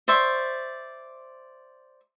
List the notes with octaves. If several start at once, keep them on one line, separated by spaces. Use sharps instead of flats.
C5 D5 E5 C#6